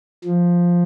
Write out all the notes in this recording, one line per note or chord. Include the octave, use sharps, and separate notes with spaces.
F3